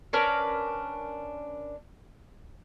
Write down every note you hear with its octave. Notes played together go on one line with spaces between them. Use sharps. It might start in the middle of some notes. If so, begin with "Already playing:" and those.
C#4 D4 A#4 B4